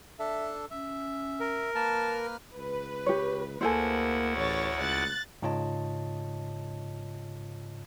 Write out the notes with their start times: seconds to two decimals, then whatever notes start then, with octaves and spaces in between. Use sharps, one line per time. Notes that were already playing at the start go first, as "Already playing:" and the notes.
0.19 D4 A4 E5
0.71 C#4 E5
1.40 A#4
1.75 A#3 B4 A5 F6
2.55 C#2 B4
3.06 G4 C#5
3.61 D2 A#3 E4 G#4 A4 C5 F#5
4.37 A1 C#5 A6
4.79 C#2 F#6 A6
5.42 G#2 C#3 F4 C#5 D#5 A5